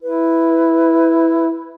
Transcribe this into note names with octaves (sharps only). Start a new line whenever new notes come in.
E4 B4